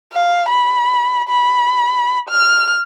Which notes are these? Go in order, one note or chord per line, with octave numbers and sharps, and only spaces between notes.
F5
B5
B5
F6